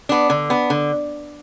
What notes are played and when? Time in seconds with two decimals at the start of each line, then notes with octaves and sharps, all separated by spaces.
0.09 B3 D4
0.30 D3
0.50 B3 D4
0.70 D3